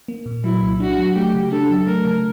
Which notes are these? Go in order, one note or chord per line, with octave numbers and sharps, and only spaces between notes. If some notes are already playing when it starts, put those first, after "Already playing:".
A#3
A#2
F#3 E4
C2
D4 F#4
F#3
A3 G4
C#3
D4 A4
F#3
A3 A#4
C#3